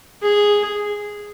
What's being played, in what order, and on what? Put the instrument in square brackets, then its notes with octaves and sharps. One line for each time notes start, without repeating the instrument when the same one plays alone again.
[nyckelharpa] G#4